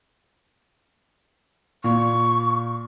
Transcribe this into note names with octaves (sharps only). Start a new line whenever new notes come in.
A#2 C#6